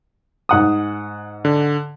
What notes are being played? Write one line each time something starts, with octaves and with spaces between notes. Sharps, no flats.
G#2 F#5 D#6
D3